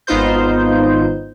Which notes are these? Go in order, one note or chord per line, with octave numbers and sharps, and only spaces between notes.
G#1 B3 D#4 F4 C5 G6